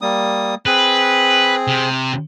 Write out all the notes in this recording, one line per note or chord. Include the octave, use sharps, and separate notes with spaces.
G3 A#3 D#6
C4 G#4 B4
C3